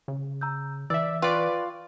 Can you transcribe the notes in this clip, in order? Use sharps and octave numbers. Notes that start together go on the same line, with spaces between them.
C#3
A#5 E6 G6
E3 D5 E5 E6
F4 B4 D5 G5 C#6